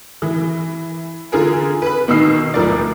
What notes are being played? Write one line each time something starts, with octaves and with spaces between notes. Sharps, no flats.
E3
D3 F4 G#4 A#4
B4 B5
B2 D#3 D#4 E6 C7
D2 F3 A#4 D5